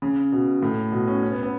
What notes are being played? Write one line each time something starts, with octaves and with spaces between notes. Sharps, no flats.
C#3
B2
A2
B2
C#4
C#4
B3
B3